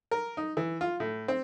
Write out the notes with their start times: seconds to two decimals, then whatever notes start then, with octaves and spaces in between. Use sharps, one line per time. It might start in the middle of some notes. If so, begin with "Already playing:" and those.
0.11 A#4
0.37 D#4
0.57 E3
0.81 F4
1.00 A2
1.28 C4